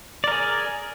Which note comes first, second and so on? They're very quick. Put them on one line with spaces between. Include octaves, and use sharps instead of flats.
D5 A#4 G#4